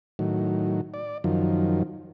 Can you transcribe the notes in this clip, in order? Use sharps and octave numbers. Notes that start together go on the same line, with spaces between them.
A2 D#3 F#3
D5
F#2 D#3 F3